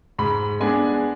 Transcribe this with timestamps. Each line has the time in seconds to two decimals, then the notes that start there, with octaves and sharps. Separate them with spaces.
0.19 G#2 B5
0.60 G#3 B3 D4 G#5